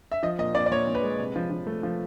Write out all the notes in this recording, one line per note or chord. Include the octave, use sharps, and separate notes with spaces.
E5
F3 D#5
A#2 D#5
A#2 D5
D5
A#2 C#5
A#2
B4
G#3
C3
F3
F3
A3
F3